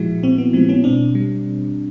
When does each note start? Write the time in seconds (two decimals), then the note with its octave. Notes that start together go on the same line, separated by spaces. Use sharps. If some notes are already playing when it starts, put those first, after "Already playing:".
Already playing: A#2 F3 G#3 E4 F#4
0.23 A#2 C4
0.38 B3
0.53 F3 G#3 C4
0.69 B3 C#4
0.84 B2 C4 D4
1.15 G3